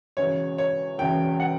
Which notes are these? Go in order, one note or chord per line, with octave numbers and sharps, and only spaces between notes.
E1 E2 C#3 E3 C#5
C#5
E1 E2 C#3 E3 G5
F#5